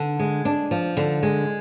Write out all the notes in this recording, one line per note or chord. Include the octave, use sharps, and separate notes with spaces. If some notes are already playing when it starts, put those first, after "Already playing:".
Already playing: D3
G#3
D4
F3
D3
G#3